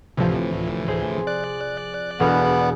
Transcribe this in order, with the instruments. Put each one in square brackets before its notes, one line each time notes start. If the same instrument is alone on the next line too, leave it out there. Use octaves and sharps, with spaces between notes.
[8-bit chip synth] D2 A2 E3 [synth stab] C3 F3
[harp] G#4 C5
[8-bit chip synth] D5 F#6
[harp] E1 G#4 F6 [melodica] B3